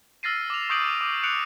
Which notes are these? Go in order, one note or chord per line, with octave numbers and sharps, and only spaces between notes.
E6 F6 A6 A#6 C7 D#7
D6 F7
C#6 D#6 G6 C7 D7 F#7
D6
F#6 C#7 D7 F7